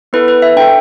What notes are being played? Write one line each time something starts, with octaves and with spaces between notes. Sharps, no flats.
B3 E4 A4 B4
B4
E5
D4 A4 G5